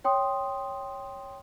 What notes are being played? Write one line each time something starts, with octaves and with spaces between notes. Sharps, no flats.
C#5 G5 C6 D#6